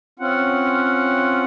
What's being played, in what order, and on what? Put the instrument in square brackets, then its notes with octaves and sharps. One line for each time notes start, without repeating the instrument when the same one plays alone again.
[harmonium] C4 C#4 F4 F#5